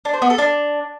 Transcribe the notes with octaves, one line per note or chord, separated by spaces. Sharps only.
D4
C5
B3
A4
D4